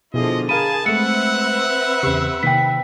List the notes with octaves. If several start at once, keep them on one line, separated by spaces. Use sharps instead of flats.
B2 D3 F3 E4 F4 G#4 D#5
G#4 A#4 F5 G#5 A5 B5 D#7
G#3 A3 C4 B4 E5 F#5 C#7
E2 C#3 G4
C3 D#3 A#3 G5 B6